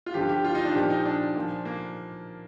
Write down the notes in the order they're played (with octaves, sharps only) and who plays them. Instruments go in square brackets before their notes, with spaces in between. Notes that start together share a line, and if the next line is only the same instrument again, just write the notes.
[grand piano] F4
G2 D3 F3 G4
G4
F4
D#4
D4
A#2 F3 G4
D#4
D4
A#2 F3
A#3